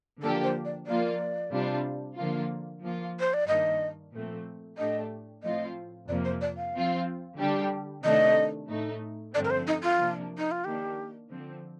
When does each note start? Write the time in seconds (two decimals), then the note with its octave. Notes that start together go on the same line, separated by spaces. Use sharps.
0.22 D3 F3 A#3 D4 G4 A4
0.43 C5
0.65 D5
0.87 F3 A#3 F4 D5
1.52 C3 G3 D4 F4
2.17 D3 F3 A#3 F4
2.83 F3 A#3 F4
3.20 C5
3.34 D5
3.47 G2 D#3 A#3 D4 D#5
4.13 A#2 F3 A3 C4
4.78 A2 A3 D4 G4 D#5
5.43 A2 F3 C4 F4 D#5
6.08 F2 C3 F3 A#3 D5
6.25 C5
6.41 D5
6.57 F5
6.74 F3 C4 F4
7.39 D3 G3 D4 G4
8.04 C3 D#3 A3 D4 D#5
8.69 A2 A3 D#4
9.34 G2 D3 F3 A3 C4 D5
9.45 A#4
9.50 C5
9.67 D#4
9.83 F4
9.99 C3 F3 A#3 D4
10.38 D#4
10.51 F4
10.64 D#3 A#3 D4 G4
11.30 D3 F3 C4